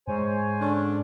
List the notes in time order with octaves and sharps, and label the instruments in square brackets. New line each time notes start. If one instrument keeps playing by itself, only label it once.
[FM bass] G#2 [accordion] C5 C#5 G#5
[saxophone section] D3 C#4 D4